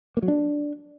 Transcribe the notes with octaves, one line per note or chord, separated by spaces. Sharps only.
A#3
F#3
D4